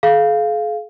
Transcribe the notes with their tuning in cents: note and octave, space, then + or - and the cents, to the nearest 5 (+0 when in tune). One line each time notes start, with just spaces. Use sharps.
G#4 +45 F5 -5